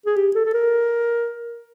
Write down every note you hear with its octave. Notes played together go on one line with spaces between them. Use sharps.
G#4
G4
A4
A4
A#4